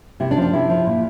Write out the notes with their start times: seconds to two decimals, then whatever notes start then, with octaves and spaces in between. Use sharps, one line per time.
0.20 C3 E4
0.31 D4
0.37 F3
0.42 D4
0.53 C3 E4
0.70 F3
0.86 A#2